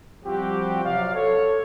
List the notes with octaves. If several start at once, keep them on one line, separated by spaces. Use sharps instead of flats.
F3 G3 C4 F#4 G4
C3 F#3 D5 F5
A4 C#5